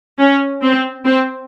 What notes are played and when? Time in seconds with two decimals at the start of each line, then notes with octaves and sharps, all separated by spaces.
0.19 C#4
0.62 C4
1.06 C4